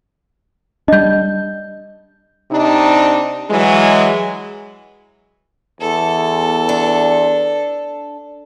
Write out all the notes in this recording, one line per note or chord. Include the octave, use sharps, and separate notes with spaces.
G3 D4 D#5 G6
C3 D4 D#4
E3 F#3 G#3
E2 A4
D4